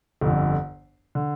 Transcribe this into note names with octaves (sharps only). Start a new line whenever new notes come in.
G1 F2 D3
D3